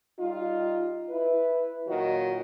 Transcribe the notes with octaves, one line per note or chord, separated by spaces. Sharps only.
G3 D#4 F4
E4 B4
A#2 D#3 F#3 F4 F#4